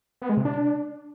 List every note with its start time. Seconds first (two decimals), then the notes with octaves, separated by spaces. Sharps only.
0.22 B3
0.29 G#3
0.37 C3
0.45 D4